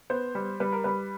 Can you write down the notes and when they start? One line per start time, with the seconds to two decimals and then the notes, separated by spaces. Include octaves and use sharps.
0.10 B3 C5
0.35 G3
0.60 G3 B4
0.72 A#4
0.84 G3 B4